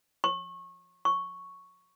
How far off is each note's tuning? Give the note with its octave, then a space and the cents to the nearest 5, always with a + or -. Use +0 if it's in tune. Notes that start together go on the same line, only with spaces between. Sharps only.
C#6 -25
C#6 +0